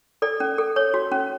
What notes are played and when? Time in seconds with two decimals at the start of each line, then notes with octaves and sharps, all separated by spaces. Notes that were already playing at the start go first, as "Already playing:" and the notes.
0.22 A4 D5
0.40 C#4
0.58 A4
0.76 C#5
0.94 F#4
1.12 C#4